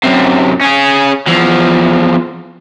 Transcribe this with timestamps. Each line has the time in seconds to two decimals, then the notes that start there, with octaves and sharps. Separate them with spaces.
0.04 F#2 C3
0.61 C#4 G#4
1.27 E2 F3